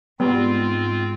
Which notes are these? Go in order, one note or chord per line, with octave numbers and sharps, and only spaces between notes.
G#2 G3 B3 C4 F4